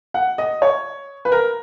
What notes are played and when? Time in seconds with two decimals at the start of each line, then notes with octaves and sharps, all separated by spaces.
0.14 F#5
0.38 D#5
0.62 C#5
1.25 B4
1.32 A#4